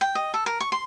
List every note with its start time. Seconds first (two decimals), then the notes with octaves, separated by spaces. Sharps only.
0.01 G5
0.15 D#5
0.34 A4
0.46 A#4
0.60 C#6
0.72 C6